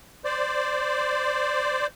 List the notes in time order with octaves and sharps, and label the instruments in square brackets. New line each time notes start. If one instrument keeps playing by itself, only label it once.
[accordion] C5 D5